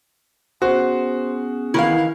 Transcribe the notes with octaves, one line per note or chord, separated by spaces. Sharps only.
B3 C#4 F#4 G#4 C5
D#3 E3 E4 F5